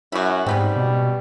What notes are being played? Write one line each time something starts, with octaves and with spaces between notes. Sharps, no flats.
F#2 E4 F#4
G#2 C#3 G3 B3 C4
B2